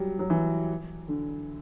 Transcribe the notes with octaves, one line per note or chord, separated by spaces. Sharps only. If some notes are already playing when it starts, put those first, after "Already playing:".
Already playing: F#3 G3
F#3
E3
D3